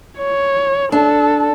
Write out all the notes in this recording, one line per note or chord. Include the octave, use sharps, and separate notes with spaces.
C#5
D4 A4